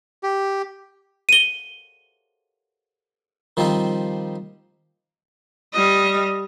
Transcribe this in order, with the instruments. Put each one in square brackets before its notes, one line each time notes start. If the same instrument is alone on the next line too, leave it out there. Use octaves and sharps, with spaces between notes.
[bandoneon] G4
[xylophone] D#7 G7
[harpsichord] D#3 F3 G3 C4 D#4 C5
[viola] G3 D#5